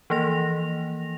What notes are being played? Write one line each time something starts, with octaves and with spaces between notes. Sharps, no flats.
E3 F3 A#3 A#6 F7